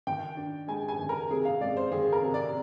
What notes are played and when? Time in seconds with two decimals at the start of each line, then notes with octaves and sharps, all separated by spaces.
0.07 D#3 G5
0.37 D4
0.68 G#3 G#5
0.88 G#5
0.99 D#3
1.09 A#4
1.30 C3 G#4
1.45 F5
1.61 G#3 D5
1.77 C5
1.92 D#3 G#4
2.12 A#4
2.23 C3
2.34 D5